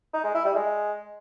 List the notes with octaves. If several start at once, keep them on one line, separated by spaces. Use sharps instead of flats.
D#4
G#3
E4
G3
G#3